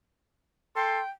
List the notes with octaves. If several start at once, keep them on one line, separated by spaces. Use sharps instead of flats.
A4 G5 C6